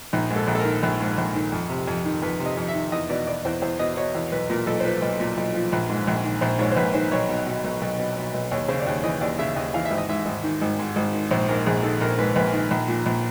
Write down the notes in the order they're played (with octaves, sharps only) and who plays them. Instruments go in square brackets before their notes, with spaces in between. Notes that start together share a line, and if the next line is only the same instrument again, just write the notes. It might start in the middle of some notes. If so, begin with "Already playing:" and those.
[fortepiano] A#1 D#4
G#2
A4
A#1
A4
A#4
D#3
A#1
G#2
A#1
D#3
F2
C3
F2
D#3
F2 B4
C3
D#5
F2
E5
D#3
E2 D#5
B2 D5
B2 D5
E2 C5
E2 C5
B2 D#5
B2 C#5
E2
B1 B4
A#2 A#4
B1 A4
C5
F3 B4
B1
A#2
B1
F3
A#1
G#2
A#1
D#3
A#1 C5
G#2 C#5
C5
A#1 B4
D#3 C5
B1 C#5
B2
B2
B1
B1
B2
B2
B1
D#2 C#5
C#3 C5
D5
D#2 C#5
E3 D#5
D#2 D5
C#3 E5
D#2 D#5
E3 F5
E5
G#1
D#5
G#2 E5
G#1
D#3
G#1
G#2
G#1
D#3
A#1 C5
G#2 A#4
A#1 G#4
D#3 A4
A#1 A#4
G#2 B4
A#1 B4
D#3
A#1
A#2
A#1